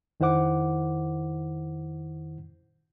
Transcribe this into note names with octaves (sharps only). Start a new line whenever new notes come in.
F2 D#3 E4 C5 F#5 D6